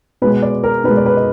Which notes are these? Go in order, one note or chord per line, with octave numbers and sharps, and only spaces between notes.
B2 G#3 B4
D5
A#4
B2 G#3 B4
D5
B4
D#5